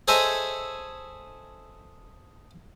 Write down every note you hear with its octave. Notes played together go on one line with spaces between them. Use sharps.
G#4 A4 C5 C#5 D#5 E5